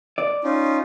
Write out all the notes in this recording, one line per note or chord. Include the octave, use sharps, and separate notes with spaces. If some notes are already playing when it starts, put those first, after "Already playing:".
D5
C#4 D#4 F4